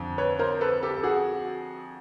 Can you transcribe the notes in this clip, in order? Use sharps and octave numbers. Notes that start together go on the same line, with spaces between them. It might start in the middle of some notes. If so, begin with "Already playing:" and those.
Already playing: F2 D3
B4 C#5
A#4 C5
A4 B4
G4 A4
A4
F#4 G#4